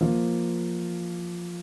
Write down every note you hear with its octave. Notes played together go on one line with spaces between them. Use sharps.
F3 A#3 F4